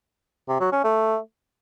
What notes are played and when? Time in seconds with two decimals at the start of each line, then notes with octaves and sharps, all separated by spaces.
0.48 C3
0.60 F#3
0.72 C#4
0.84 A3